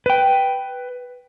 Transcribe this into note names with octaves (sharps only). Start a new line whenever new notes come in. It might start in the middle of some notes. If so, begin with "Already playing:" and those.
B4 G5